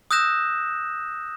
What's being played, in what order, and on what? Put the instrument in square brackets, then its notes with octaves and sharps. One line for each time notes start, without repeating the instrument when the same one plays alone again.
[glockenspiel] D#6 E6 F#6 G6 A#6 E7